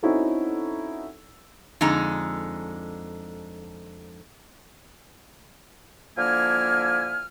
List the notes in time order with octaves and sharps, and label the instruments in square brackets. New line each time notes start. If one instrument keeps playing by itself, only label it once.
[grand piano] C4 C#4 D#4 E4 F#4 A4
[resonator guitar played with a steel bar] F2 D3 G#3 D#4 A#5
[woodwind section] D3 F3 A#3 E4 G#5 F6